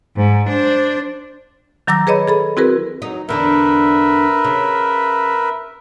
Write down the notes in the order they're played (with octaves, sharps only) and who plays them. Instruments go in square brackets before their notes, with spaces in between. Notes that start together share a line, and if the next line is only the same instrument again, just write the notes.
[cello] G#2
D4 C5
[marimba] D#3 F#3 A#5 D6 E6 A#6
G#4 B4 C#5 D#5 B5
G#4 A4 B5
C4 E4 F#4 G#4 A#4 B4
[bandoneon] F#3 [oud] D#4
[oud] E2 D3 D4 [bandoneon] A#4 B4 E5
[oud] C#3